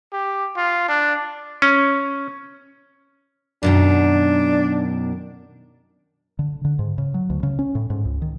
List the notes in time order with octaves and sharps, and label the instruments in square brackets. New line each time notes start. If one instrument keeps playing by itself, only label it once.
[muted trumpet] G4
F4
D4
[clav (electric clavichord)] C#4
[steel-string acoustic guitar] F#2 B2 D#3 [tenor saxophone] D4
[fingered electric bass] D3
D3
G#2
C#3
F#3
D2
C#3
C#4
A2
G#2
C#2
D#3